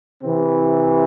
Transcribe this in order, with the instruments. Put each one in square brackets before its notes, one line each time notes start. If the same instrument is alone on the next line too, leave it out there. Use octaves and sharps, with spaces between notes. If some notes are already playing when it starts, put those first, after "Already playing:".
[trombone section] C3 E3 C4